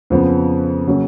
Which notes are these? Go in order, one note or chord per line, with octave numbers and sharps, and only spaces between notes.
F2 C#3 F3 B3
C#3 F#3 A#3 C#4